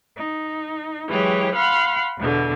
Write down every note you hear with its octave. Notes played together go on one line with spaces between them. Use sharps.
D#4
E3 F#3 G#3 G4 C#5
F5 F#5 B5 C6 F6
E2 B2 D3